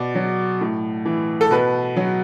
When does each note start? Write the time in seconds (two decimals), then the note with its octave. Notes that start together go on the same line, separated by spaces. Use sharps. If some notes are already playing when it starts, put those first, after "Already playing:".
Already playing: B2 D5
0.15 F#3
0.61 A2
1.05 E3
1.41 A4
1.51 B2 B4
1.96 F#3